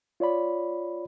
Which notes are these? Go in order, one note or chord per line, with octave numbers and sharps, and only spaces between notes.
F4 C#5 D5 B5